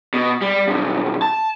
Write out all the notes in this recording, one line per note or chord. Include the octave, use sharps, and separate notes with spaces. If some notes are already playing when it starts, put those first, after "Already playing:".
B2
G3
B1 G2
A5